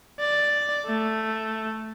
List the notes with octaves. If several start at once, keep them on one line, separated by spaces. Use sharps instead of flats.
D5
A3